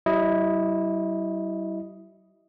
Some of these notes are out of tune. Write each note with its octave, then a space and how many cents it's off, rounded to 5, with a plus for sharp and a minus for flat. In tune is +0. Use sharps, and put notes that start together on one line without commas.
G3 -45 E4 -10 D#5 +0